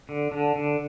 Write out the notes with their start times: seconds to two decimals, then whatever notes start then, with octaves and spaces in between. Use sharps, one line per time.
0.09 D3
0.32 D3
0.56 D3